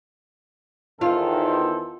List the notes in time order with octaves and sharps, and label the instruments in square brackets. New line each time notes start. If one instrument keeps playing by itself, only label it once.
[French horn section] E2 D#3 [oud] F4 [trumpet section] A4 C5